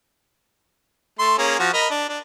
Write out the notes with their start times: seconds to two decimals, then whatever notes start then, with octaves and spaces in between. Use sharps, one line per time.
1.19 A3 C6
1.38 A#3 C#4 G#4
1.59 F3 F#4
1.74 A#4 D#5 B5
1.90 D4
2.09 D4